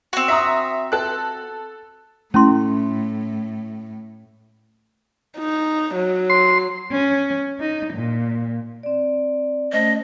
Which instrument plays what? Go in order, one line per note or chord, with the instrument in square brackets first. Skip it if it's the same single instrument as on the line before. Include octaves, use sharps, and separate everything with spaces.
[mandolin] C4 F#4
[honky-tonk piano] E5 A#5 D#6
A4 F#6
[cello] A2 [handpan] A3 [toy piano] C#4 E4 C6
[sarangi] D#4
F#3
[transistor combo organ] C6
[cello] C#4
D#4
A#2
[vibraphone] C4 D5
[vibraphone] A3 C#4 C5 [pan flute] D#5